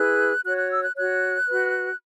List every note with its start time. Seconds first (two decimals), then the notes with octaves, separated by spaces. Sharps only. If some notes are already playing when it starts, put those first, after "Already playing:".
Already playing: E4 G#4 B4 F#6
0.44 F#4 C#5 F#6
0.57 F#6
0.70 E6
0.83 F#6
0.95 F#4 C#5 F#6
1.47 F#4 B4